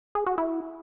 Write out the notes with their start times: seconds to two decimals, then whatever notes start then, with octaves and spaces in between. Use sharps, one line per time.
0.15 G#4
0.26 F#4
0.38 E4